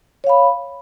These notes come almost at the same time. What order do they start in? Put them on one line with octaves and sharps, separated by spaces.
C#5 F5 B5